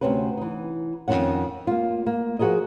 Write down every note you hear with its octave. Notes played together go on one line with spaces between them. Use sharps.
D2 G#2 C3 C4 C#4 B4
E3 D#4
F2 C3 D#3 C#4 F#5
A#3 F4
A#3
F3 F#4 G#4 A#4 D#5